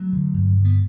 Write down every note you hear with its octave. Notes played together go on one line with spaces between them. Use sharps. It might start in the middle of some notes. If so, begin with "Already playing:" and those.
Already playing: F#3 A3
D3
G2
D3
B3